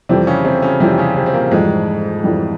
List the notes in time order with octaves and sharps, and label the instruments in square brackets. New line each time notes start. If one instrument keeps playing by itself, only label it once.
[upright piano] F2 E3 G3 [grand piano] C3 C4
[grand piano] C#3 C#4
C3 C4
C#3 C#4
[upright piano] F2 E3 G3 [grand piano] C3 C4
[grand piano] C#3 C#4
C3 C4
C4
A#2 A#3
[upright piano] F2 E3 G3 [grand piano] G#2 G#3
[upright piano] F2 E3 G3